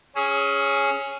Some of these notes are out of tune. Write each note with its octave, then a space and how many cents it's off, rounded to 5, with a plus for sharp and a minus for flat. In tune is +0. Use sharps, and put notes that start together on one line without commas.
C#4 +0 G#4 +0 D#6 +40